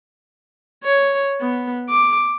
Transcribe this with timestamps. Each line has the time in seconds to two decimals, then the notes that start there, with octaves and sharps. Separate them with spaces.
0.84 C#5
1.41 B3
1.89 D6